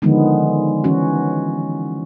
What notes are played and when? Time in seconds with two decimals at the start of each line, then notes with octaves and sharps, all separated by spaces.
0.02 D3 D#3 F3 G#3 B3
0.84 E3 C#4 F#4